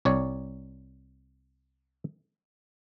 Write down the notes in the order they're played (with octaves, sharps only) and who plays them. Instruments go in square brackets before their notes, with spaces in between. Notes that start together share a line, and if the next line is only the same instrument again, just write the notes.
[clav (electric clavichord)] C2 C#5 D5